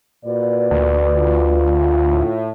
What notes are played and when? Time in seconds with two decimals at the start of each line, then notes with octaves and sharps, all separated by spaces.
0.25 A#2 F#4 B4 D5
0.71 D2
1.16 F4
2.10 A2